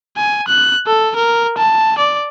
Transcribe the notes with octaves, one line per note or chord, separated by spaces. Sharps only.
G#5
F#6
A4
A#4
A5
D5